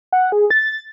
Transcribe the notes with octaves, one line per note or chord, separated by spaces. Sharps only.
F#5
G#4
A6